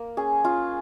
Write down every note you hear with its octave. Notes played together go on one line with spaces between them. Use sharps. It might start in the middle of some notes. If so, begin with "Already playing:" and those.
Already playing: A#3
C#4 G#4
C#4 F4